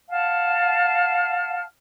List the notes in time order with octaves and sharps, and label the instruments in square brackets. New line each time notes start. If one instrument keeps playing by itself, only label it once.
[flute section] F5 F#5 A5 F6